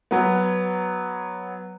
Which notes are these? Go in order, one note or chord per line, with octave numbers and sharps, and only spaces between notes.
F#3 B3